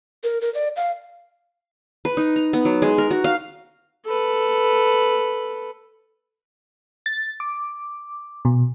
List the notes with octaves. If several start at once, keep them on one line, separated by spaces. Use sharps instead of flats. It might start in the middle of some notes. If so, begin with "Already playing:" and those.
A#4
A#4
D5
F5
B4
D#4
A#5
B3
F#3
G#3
A#4
F#4
F5
A4 B4
A6
D6
B2